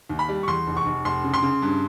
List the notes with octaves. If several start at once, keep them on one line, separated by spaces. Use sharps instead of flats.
D#2
B5
G3
C#6
E2 C6
F1
C#6
F1
F1 C6
C#3
C6
C#3
G2